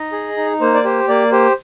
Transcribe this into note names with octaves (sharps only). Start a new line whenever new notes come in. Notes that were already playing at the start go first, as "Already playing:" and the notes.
Already playing: D#4 D#5
G#4
D#4
A#3 C5
D5
G4 C5
A#3 D5
G4 C5